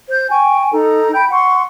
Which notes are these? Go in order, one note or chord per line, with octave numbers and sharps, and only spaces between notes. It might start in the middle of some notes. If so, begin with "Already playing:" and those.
C5 G6
G5 G#5 C#6
D#4 A4 A#5
G5 B5 G6
F#5 C6 C#6